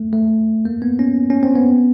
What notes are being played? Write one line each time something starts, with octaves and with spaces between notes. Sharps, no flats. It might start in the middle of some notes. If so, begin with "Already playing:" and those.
Already playing: A3
A3
A#3
B3
C#4
C#4
C4
B3